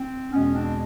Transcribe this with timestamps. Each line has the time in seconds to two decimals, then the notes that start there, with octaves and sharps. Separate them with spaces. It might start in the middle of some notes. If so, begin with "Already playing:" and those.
Already playing: C4
0.32 E2 B2 G#3 B3 C#4
0.54 C4 D4